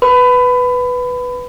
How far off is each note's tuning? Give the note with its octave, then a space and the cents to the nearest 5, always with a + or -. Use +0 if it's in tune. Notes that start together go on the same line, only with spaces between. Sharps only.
B4 +0 B5 +25